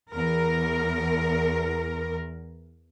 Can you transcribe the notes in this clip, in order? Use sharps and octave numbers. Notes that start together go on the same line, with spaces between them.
E2 A#4